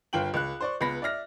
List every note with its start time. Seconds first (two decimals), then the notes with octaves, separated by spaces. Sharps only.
0.13 G1 F4 G5 F#7
0.34 C#2 F#6
0.60 C5 D5 C#6
0.81 C#2 B3 B5 A#6
1.02 D5 E5 F6 A#6